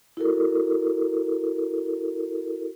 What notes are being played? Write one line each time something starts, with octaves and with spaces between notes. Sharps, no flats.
E4 F#4 A4 A#4